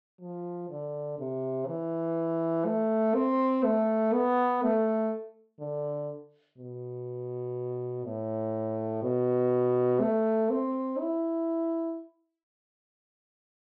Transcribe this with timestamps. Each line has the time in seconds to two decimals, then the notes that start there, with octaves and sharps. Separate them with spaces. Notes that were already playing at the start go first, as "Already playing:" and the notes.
0.21 F3
0.70 D3
1.19 C3
1.67 E3
2.66 A3
3.15 C4
3.64 A3
4.13 B3
4.63 A3
5.60 D3
6.58 B2
8.06 A2
9.03 B2
10.01 A3
10.51 C4
11.00 E4